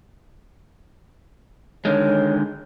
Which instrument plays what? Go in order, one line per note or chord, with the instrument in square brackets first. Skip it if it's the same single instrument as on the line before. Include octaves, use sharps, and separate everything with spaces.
[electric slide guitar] D3 D#3 G#3 [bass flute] C#5